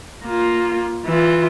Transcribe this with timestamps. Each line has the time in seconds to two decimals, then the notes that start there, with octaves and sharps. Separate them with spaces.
0.25 A#3 F4
1.06 E3 F4